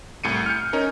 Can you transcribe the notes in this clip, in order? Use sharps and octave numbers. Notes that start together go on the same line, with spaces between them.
C2 A2 C#7 D#7
F6 G6 C#7
C#4 D#4 A#4